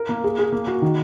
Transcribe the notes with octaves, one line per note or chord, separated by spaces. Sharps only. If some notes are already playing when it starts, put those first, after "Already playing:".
Already playing: A#4
A#3
G#4
G#4
A#3
F#4
D#3